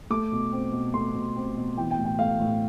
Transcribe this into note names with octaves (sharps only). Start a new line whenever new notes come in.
A3 D6
B2
C4
B2
A3 C6
B2
C4
B2
E3 G5
G5
A2
G5
A3 F5
A2